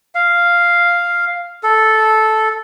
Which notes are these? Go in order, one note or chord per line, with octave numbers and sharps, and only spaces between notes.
F5
A4